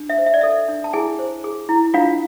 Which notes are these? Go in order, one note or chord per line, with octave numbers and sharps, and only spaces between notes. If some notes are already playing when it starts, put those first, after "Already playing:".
Already playing: D4
E5
C5
E5
D5
A4 E5
D4
A5
E4 G#4 G#5
C5
G#4
E4
D4 F4 F5